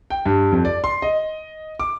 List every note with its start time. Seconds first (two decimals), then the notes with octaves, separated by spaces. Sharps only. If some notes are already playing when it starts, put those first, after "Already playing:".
0.10 G5
0.26 G2
0.52 F2
0.65 D5
0.84 C6
1.02 D#5
1.80 D6